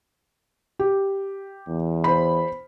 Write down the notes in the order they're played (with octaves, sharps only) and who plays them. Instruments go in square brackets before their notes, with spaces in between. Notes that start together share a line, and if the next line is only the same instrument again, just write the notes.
[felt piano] G4
[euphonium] E2
[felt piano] C5 B5